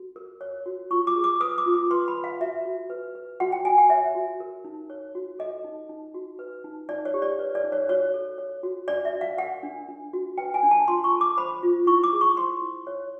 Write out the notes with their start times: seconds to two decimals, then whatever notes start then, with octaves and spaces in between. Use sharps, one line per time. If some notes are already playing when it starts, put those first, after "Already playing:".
Already playing: F#4
0.16 A#4
0.41 C#5
0.66 F#4
0.91 F4 C#6
1.07 D6
1.16 G#4
1.24 D6
1.40 B4 D#6
1.58 D6
1.66 F4
1.74 D6
1.91 B4 C6
2.08 B5
2.15 B4
2.24 F5
2.40 F#4 E5
2.65 F#4
2.90 B4
3.15 B4
3.40 F#4 F#5
3.52 G5
3.65 F#4 G#5
3.78 F#5
3.90 C#5 E5
4.15 F#4
4.40 A#4
4.65 D#4
4.90 C#5
5.15 F#4
5.39 A4 D#5
5.64 D#4
5.89 D#4
6.14 F#4
6.39 B4
6.64 D#4
6.89 D#4 D5
7.05 C#5
7.14 G4
7.22 D5
7.39 B4 C#5
7.55 D5
7.64 D#4
7.72 C#5
7.89 F#4 C#5
8.14 A4
8.38 C#5
8.63 F#4
8.88 D4 D5
9.05 E5
9.13 F#4
9.21 F5
9.38 A#4 F#5
9.63 D4
9.89 D4
10.13 F#4
10.38 B4 G5
10.54 G#5
10.63 D4
10.71 A5
10.88 F4 C6
11.04 C#6
11.13 A4
11.21 D6
11.37 C5 B5
11.63 F4
11.87 E4 C#6
12.04 D6
12.13 G#4
12.21 C#6
12.37 C5 C6
12.62 E4
12.87 C#5